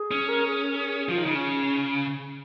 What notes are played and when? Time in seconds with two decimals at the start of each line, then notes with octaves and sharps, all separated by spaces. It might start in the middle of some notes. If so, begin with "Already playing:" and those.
Already playing: G#4
0.11 C#4
0.29 A#4
0.47 G#4
0.64 A#4
0.76 G#4
0.88 G#4
1.00 G#4
1.09 F3 F4
1.17 D#3
1.24 C#3 D#4
1.35 C#4